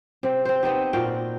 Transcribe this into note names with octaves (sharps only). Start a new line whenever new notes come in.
C3 C4
C4 C5
B3 C4 D#4 G4
A#2 F#4 F5 G5